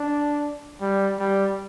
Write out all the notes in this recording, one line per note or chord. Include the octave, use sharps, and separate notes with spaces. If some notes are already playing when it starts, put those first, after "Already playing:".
Already playing: D4
G3
G3